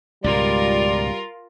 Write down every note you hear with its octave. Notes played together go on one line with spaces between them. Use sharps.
C#2 G#2 B2 G3 F4 A#4 D5